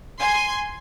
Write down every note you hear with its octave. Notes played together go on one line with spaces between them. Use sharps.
G#5 C6